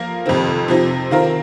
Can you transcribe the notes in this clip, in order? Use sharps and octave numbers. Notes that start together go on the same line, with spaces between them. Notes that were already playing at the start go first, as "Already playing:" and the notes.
Already playing: F3 A#3 F4 A#4
F2 C3 D#3 C4
C3 F3 C4 D#4
D#3 C4 F4 A#4